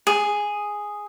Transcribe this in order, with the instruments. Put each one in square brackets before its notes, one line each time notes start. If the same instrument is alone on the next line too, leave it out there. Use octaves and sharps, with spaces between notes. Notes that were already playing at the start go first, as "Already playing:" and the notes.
[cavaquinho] G#4